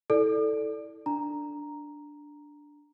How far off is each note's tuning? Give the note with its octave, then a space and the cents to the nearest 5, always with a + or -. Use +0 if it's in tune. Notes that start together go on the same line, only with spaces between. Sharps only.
E4 -25 A4 +0 D5 +0
D4 +0 A#5 +0